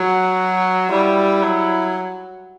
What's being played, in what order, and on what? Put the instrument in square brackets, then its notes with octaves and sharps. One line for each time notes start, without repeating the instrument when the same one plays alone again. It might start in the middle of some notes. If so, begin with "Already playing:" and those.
Already playing: [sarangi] F#3 [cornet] F#4
[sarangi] G3 [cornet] E4
[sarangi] F#3